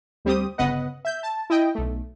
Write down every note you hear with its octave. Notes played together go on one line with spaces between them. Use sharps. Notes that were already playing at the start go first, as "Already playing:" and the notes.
D2 G3 C4 G4 D#6
G1 C#3 B3 B4 D#5 F#5
E5 G6
A5
E4 D#5 G5
B1 A3